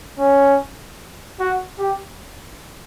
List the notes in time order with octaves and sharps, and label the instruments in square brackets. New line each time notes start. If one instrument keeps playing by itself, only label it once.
[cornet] C#4
F#4
G4